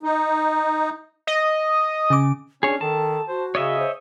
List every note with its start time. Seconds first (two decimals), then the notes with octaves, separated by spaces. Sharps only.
0.03 D#4
1.27 D#5
2.10 C#3 D6
2.63 C#4 D4 G#4 C#5
2.81 D#3 A4 A5
3.28 F#4 C5
3.55 C#3 C#5 D#5 E5
3.79 C5